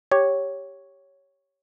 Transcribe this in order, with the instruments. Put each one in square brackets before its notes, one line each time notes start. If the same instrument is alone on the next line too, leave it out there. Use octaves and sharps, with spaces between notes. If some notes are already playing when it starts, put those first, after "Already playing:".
[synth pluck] G4 C#5